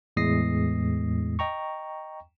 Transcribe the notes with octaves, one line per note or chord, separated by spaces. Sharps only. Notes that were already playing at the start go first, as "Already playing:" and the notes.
E2 A2 G#3 D#6 A#6 C7
D#5 G5 A#5 C#6